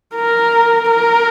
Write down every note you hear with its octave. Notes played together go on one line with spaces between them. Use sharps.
A#4
A#4